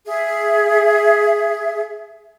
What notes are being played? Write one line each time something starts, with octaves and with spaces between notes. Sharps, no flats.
G#4 E5